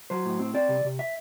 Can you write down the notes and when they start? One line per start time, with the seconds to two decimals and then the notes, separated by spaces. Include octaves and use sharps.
0.10 F#3 C5
0.25 A2
0.40 C4
0.54 C4 D5
0.69 C3
0.84 C3
0.99 E5